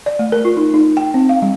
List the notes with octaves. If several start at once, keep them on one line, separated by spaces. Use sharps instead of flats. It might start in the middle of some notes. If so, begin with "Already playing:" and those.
D5
A3
A#4
F4
D#4
D#4
G5
C4
F5
G3